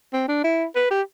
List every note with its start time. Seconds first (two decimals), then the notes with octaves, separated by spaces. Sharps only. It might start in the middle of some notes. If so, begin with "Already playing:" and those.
0.13 C4
0.28 D4
0.44 E4
0.76 B4
0.91 G4